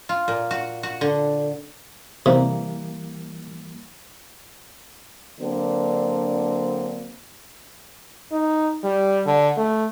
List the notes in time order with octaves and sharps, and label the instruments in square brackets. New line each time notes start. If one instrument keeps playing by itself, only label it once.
[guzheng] F4
A#2
F#4
F#4
D3
[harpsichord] C3 [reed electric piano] E3 G3 A#3
[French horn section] D3 F#3 A#3 C4 D4
[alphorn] D#4
G3
D3
A3